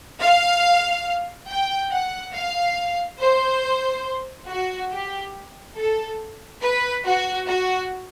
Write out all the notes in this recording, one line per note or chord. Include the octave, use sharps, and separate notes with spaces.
F5
G5
F#5
F5
C5
F#4
G4
A4
B4
F#4
F#4